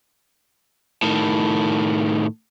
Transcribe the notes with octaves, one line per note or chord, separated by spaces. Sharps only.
A2 D#3